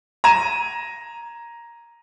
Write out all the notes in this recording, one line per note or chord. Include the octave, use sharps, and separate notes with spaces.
A#5 G#6 D#7 E7